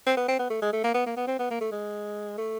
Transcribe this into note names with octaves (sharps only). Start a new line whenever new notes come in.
C4
B3
C4
B3
A3
G#3
A3
A#3
B3
A#3
B3
C4
B3
A#3
A3
G#3
A3